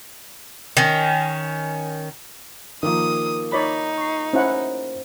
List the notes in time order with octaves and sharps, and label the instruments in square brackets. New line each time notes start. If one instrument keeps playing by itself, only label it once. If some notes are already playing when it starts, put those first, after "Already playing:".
[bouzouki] D#3 C#4
[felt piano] D#3 F3 A#3 [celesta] A#4 D6 [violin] D#6
[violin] D#4 [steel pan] C#5 D5 B5
[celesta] C#6 C7
[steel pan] C#4 E4 F#5 [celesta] C5